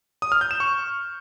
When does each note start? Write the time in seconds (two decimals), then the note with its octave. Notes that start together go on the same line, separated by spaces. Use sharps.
0.22 D#6
0.32 F6
0.41 G6
0.51 E7
0.60 C#6